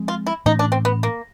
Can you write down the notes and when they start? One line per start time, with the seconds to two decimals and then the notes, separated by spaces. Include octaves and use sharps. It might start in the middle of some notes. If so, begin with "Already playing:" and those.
Already playing: F3 G#3 C4
0.08 F4
0.27 E4
0.46 A2 E3 A3 C#4 D#4
0.59 D4
0.72 C4
0.85 B3
1.03 A#3